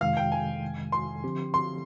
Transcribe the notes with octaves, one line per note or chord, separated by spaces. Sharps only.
F2 C3 D#3 G#3 F5
G5
G#5
C6
D3 F3 C4 G4
C6